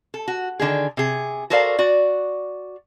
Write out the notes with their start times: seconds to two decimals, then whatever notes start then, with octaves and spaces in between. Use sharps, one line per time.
0.14 A4
0.28 F#4
0.59 D3 D#3 G#4
0.97 C3 G#4
1.50 F#4 A4 A#4 C5 D5 F5
1.79 F#4 D5